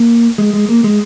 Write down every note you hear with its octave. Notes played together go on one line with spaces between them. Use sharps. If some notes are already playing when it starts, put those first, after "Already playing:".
Already playing: A#3
G#3
G#3
A#3
G#3